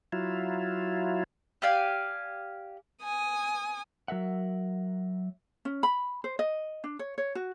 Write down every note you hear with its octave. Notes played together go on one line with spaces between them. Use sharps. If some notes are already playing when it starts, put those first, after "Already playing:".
F#3 E4 F4
G4 D5 F5 G#5
G#5 D#6
F#3 A#4 E5 F#5
C#4
B5
C5
D#5
D4
C#5
C#5
F#4